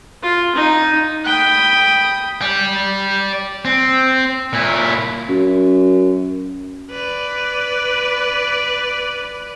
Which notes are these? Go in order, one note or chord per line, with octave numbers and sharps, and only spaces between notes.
F4
D#4
G5 B5 D#6
D5 G5
C4
A#2 E4
F#2
B4 D5